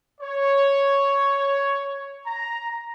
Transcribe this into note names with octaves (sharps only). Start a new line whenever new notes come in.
C#5
A#5